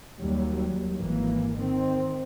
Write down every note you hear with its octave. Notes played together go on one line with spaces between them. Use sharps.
D#2 F#3 G3
G#1 E3 A#3
D#3 C4